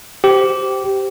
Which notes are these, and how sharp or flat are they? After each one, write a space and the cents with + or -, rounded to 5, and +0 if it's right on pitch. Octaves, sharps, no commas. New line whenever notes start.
G4 -15 C5 -15